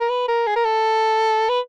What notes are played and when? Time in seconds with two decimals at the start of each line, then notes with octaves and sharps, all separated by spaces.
0.01 A#4
0.10 B4
0.28 A#4
0.47 G#4
0.56 A#4
0.65 A4
1.49 B4